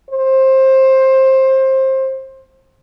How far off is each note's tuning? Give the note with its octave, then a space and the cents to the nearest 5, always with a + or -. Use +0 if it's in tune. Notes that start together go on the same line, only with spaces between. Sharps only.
C5 +20